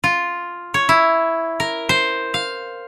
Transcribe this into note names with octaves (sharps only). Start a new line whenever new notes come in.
F4
C#5
E4
A#4
C5
F5